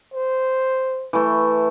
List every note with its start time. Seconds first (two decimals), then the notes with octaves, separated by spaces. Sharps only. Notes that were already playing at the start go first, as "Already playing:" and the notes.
0.14 C5
1.13 E3 A3